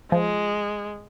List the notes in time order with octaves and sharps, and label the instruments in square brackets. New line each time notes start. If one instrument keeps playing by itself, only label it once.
[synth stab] F3 [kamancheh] G#3